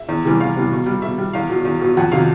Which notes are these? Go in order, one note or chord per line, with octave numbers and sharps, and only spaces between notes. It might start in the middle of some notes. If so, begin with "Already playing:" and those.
Already playing: E5
E2
C3 E3 G3
E2 F5
C3 E3 G3
B2
G3
B2 E5
G3
E2 F5
B2 F#3
E2
B2 F#3
F2 F#5
C3 D#3 F#3 F5